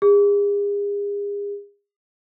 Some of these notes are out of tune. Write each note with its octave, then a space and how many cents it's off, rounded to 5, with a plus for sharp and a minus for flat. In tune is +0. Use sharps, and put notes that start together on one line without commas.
G#4 -40